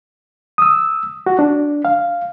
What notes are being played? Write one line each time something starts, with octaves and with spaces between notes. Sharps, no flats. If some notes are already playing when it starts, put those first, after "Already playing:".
D#6 E6
F#4
D4
F5